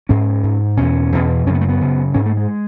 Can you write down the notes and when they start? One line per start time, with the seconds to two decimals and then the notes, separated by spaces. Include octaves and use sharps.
0.09 G#2 C#4
0.44 G#2
0.77 E2 B2 C#4
1.12 E2 B2
1.47 F#2 C#4
1.50 C#3 B3
1.61 A3
1.69 B3
1.81 F#2 C#3
2.14 G#2 C#4
2.26 A3
2.37 G#3